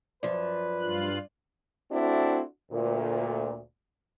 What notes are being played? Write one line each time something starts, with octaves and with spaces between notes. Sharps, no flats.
F#2 F3 B4 D5
G2 F4 F#6
A3 C4 D4 E4 F#4
D2 A#2